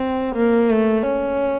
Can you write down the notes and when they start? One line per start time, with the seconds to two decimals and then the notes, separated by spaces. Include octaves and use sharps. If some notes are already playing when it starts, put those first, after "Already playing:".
Already playing: C4
0.35 A#3
0.71 A3
1.06 C#4